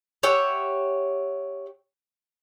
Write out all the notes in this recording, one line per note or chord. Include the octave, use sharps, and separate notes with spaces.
G4 C#5 E5 F#5